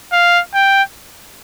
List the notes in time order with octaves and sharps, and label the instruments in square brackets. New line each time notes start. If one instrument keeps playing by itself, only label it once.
[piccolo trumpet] F5
G5